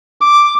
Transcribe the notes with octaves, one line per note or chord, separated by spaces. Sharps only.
D6